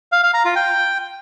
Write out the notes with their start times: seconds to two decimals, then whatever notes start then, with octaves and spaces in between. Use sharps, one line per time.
0.12 F5
0.23 F5
0.34 A#5
0.45 F4
0.56 G5